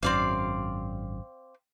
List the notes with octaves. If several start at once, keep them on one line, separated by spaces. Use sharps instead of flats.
G#1 F#2 C4 D5 F5